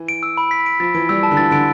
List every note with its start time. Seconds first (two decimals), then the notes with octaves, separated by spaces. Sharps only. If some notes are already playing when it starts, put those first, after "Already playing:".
Already playing: E3
0.09 D7
0.23 E6
0.37 B5
0.51 B6
0.66 D7
0.80 F3 A6
0.94 E3 D7
1.09 G3 E6
1.23 A5
1.31 D3
1.37 E3 A6
1.51 D3 D7